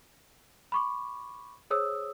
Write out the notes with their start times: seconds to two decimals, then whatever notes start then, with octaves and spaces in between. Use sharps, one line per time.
0.72 B5 C#6 D6
1.70 G#4 C5 C#5 D#6 E6